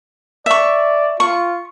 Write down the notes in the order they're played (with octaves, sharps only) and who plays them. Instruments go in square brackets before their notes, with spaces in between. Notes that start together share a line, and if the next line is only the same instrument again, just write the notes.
[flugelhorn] D5 [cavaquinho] E5 C#6
[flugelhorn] F4 [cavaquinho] C#6